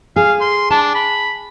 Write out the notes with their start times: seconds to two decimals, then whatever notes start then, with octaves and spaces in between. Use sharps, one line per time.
0.16 G#4 F5
0.41 C6
0.71 D4 A5
0.95 B5